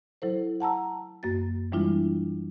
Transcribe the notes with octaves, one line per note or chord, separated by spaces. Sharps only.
F#3 E4 A4 C5
F#5 A5 A#5 E6
F#2 A#3 F#4 A6
E3 G3 G#3 D4 E4 F4